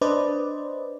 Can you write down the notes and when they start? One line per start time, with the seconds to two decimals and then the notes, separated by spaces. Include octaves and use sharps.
0.01 D4 B4 C5 D5 D#5